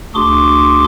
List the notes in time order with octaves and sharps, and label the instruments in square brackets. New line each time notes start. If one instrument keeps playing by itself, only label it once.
[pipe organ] D2 D4 F#4 G#4 C6 D6